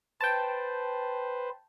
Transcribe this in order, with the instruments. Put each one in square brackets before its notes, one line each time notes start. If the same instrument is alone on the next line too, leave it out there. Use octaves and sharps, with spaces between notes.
[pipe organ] B4 C5 [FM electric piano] G5 A5